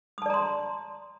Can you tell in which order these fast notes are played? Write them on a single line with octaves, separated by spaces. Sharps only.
D#6 A5 D5 A#5 C6